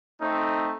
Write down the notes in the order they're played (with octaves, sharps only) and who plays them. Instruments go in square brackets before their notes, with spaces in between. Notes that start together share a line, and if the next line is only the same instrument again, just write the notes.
[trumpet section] A3 C4 D#4